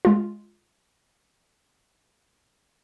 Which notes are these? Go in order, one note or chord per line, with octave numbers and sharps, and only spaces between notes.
G#3 F4